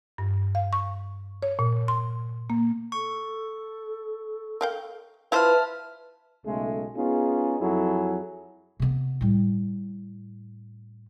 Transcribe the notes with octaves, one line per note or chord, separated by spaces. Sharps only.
G2
F5
C#6
C#5
A#2
C6
A#3
A4 C#6
A#4 F5 G5
E4 F4 B4 C5 E5 A5 F6
B1 C#3 G#3 A3
B3 C#4 D#4 F4 G#4
F2 F#3 E4 G#4 A4
C3 B3
A2 G3